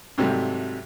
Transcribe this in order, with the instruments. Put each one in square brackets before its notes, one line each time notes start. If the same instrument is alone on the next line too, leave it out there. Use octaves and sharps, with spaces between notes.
[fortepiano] G#2 C3 F#3 G3 A3